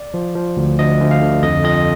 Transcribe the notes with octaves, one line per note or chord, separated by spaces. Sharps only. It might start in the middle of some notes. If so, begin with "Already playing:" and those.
Already playing: D5
F3
F3
D2
D2 D#5
D2
F5
D3
F2 D#5
F2 D#5